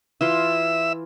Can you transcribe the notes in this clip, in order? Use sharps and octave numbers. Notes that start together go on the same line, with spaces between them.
E3 F4 E5 C6